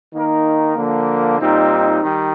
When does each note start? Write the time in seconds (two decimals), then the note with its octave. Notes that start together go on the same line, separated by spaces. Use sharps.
0.13 D#3 A#3 D#4 A#4
0.76 D3 F3 A#3
1.39 A#2 G3 C4 D#4
2.03 D#3 G3